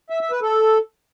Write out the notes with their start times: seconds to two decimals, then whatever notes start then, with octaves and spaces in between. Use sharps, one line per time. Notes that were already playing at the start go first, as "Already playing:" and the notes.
0.10 E5
0.21 E5
0.31 B4
0.42 A4